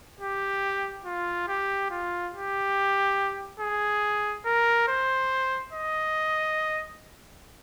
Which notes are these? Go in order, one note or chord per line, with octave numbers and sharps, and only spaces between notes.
G4
F4
G4
F4
G4
G#4
A#4
C5
D#5